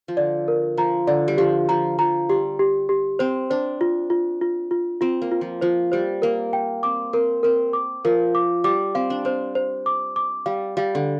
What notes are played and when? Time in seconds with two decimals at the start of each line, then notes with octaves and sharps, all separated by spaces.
0.08 F3
0.17 D3 D5
0.48 A#4
0.77 F3 A#5
1.07 D3 D5
1.28 G3
1.38 F3 G4
1.69 F3 A#5
1.99 F3 A#5
2.29 G3 G4
2.59 G4
2.89 G4
3.19 C4 C5
3.50 D4 C5
3.81 F4
4.10 F4
4.42 F4
4.71 F4
5.01 C4 F4
5.22 A#3
5.31 F4
5.41 F3
5.61 F3 C5
5.92 G3 C5
6.22 A#3 A#4
6.53 G5
6.83 C4 D6
7.13 C4 A#4
7.43 C4 A#4
7.73 D6
8.05 F3 A#4
8.35 D6
8.64 G3 D6
8.95 C4 F5
9.10 D4
9.25 C4 C5
9.55 C5
9.86 D6
10.16 D6
10.46 G3 F5
10.77 G3 F5
10.95 D3